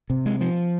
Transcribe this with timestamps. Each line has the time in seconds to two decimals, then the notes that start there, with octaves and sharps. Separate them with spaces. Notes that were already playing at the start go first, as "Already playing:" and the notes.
0.10 C3
0.26 G#3
0.41 F3